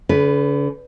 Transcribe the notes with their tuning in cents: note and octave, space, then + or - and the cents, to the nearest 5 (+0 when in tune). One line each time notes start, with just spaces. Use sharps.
D3 -45 B4 +0